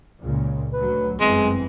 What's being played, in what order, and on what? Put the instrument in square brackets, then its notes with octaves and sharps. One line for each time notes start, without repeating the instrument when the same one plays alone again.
[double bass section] C#2 A#2 C#3
[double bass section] D2 F#3 [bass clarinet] B4
[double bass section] G1 F#2 E3 [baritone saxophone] G#3 [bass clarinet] C4